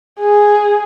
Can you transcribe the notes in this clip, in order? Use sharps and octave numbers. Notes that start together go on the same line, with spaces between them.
G#4